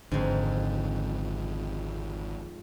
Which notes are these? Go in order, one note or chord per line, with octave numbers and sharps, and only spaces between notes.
G#1 F2 G#2 D3